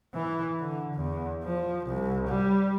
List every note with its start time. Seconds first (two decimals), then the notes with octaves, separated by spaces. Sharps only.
0.14 E3
0.60 D3
0.95 E2
1.44 F3
1.87 C2
2.28 G3